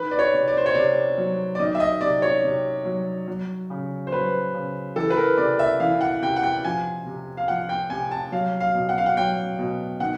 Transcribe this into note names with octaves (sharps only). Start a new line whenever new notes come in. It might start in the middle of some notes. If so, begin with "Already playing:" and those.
Already playing: D#3 B4
D5
C#5
C3
D5
C5
C#5
C3 D5
F#3
D5
D#3 D#5
E5
D#5
C3 D5
C#5
C3
F#3
F#3
C#3
C5
F#3 B4
C#3
E3 A4
B4
A#4
C3 D5
E5
E3 F5
F#5
C3 G5
F#5
G5
F3 G#5
C3
F5
F3 F#5
G5
C3 G#5
A5
F#3 F5
F5
B2
F#5
F5
F#5
F#3 G5
B2
D#3 F#5